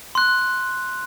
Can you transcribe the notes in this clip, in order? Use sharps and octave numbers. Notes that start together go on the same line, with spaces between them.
C6 F#6